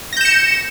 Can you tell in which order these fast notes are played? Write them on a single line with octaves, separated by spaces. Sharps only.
A#6 G6 E7 C#7